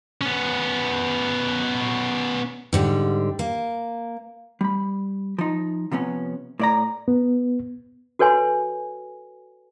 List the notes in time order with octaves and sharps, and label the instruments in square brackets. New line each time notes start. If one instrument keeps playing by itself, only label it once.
[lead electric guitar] B3 C#4
[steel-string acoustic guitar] G#2 D3 G3
A#3
[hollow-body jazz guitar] G3 B5
F3 D#4
C3 F3 B3 C#4
A2 D5 A#5
[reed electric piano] B3
[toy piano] F#4 A4 B4 C#5 G#5 C6